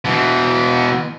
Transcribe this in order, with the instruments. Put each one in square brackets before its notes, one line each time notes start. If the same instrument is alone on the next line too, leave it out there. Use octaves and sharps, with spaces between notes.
[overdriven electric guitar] B2 E3